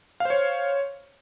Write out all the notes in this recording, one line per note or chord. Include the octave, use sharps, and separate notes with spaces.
C5 C#5 F5